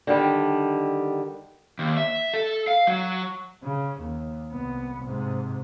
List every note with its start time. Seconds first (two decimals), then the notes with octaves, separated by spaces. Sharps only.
0.07 D3 D#3 G3
1.79 D#2
1.97 E5
2.34 A4
2.68 F5
2.87 F#3
3.63 C#3
4.00 D#2
4.52 C2 B3
5.04 G#2 C3